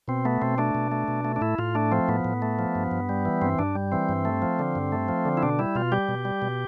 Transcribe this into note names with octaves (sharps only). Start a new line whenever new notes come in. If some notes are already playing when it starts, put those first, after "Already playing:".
B2 C4
A3 B3
B2 C4
A3 D4
B2
A3
B2
A3
D4
A2 E4
A2 F4
A3 D4
F3 C4
A2 B3
A2
A3
F3
G2
G2
G3
E3
G2 C4
G2 D4
G3
E3 C4
G2
A3
F3
D3
G2
A3
F3
D3
E4
B2 D4
G3 E4
B2 F4
G3 G4
B2
G3
B2